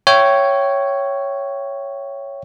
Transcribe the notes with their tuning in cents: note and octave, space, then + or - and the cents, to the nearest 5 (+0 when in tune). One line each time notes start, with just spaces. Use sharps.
C#5 +0 E5 +35 G5 -20